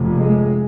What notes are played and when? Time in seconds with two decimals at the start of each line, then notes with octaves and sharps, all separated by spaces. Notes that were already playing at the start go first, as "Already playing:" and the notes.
Already playing: F1 F2 C3
0.16 G#3